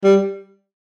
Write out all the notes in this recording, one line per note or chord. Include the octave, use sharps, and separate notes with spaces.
G3